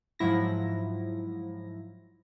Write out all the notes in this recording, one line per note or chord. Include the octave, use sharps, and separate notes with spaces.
G#2 F3 F#3 E4 A#6